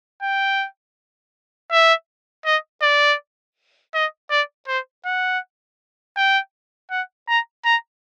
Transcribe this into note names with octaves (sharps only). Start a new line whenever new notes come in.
G5
E5
D#5
D5
D#5
D5
C5
F#5
G5
F#5
A#5
A#5